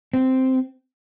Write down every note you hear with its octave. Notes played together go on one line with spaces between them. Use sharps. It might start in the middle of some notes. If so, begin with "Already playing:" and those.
C4